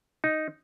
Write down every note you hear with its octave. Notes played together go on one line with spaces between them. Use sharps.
D#4